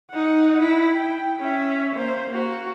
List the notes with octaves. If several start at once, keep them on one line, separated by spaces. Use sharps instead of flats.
D#4 F#5
E4
G5
C#4 E5
A#3 C5
A#3 F#4